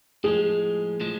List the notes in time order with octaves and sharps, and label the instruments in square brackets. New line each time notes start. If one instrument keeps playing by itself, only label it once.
[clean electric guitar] A2 F3 G#3 [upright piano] G#4
[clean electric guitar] A2 F3 G#3